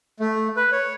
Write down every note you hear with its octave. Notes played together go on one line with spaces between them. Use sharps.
A3
B4
C#5